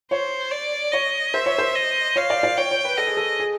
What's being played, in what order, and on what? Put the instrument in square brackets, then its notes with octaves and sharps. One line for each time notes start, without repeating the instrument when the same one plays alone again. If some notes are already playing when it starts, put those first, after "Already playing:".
[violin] C5 [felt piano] C#5
[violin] D5
[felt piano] C#5 [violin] D#5
[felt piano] C5 [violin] E5
[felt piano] C#5
C5
[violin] D#5
[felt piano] C#5 [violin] F5
[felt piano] D5
D5
[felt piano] C#5 [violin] G5
[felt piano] C#5
B4
[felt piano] A4 [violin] D#5
[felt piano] G#4
A4
G#4